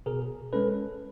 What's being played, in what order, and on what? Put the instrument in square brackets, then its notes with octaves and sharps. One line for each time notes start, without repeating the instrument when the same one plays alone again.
[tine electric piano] B2 G#4 A#4
G#3 C#4 A4 B4